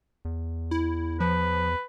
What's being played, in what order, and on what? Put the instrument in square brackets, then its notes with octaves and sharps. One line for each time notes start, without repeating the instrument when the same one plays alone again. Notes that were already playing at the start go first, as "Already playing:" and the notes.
[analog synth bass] E2
[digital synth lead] E4
[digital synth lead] F3 [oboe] B4